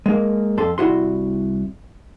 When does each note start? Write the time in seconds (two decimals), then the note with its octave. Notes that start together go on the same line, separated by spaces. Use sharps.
0.06 G#3 A#3
0.57 F2 A4 C6
0.78 C2 E4 F#4 C6